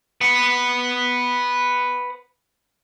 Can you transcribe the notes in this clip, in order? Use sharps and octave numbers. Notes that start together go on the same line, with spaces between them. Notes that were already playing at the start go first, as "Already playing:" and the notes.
B4 F#5